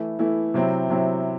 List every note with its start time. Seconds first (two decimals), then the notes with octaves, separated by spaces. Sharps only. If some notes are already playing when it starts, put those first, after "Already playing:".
Already playing: E3 A3 E4
0.19 E3 A3 E4
0.54 C3 F#3 C4 E4
0.90 C3 F#3 C4 E4